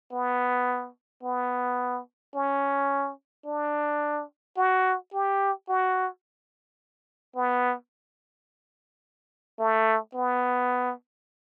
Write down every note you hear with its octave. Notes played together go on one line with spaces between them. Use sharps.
B3
B3
C#4
D4
F#4
G4
F#4
B3
A3
B3